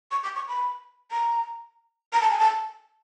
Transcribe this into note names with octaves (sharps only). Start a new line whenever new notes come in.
C#6
D6
C#6
B5
A#5
A#5
A5
G#5
A5